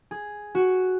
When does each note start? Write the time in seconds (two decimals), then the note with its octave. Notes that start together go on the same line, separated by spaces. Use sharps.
0.11 G#4
0.55 F#4